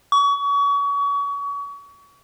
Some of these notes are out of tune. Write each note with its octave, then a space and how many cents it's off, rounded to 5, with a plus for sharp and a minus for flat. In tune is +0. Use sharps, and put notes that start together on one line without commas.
C#6 +35